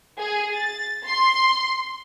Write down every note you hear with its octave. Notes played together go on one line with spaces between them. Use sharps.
G#4
A6
C6